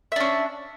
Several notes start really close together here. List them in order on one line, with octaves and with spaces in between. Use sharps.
E5 D4 C#4